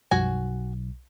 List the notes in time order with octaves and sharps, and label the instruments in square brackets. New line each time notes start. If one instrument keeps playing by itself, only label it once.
[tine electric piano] B1 [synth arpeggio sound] F#2 F3 G3 [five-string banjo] F#4 G#5